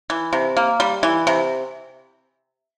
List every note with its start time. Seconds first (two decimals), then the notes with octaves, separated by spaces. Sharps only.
0.10 E3
0.33 C3
0.57 A#3
0.80 G3
1.03 E3
1.27 C3